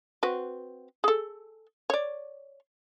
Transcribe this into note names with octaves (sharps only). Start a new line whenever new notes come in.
C4 F#4 B4
G#4 A4
C#5 D5